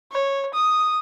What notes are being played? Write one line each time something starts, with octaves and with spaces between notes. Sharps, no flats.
C#5
D#6